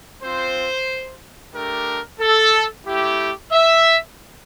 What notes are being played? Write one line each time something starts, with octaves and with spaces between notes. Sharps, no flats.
C4 F4 C5
A3 D4 G4 A#4
A4
A3 E4 G4
E5